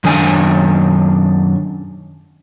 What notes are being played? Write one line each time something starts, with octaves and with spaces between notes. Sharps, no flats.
F#2 D#3 D4 G#5